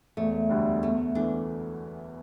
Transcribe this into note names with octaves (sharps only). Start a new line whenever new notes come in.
E1 A3
D2 D3 G3
E2 A3
E3 A3 D4